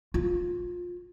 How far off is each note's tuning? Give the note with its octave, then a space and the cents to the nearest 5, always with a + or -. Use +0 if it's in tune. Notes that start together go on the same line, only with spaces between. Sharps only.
F4 +20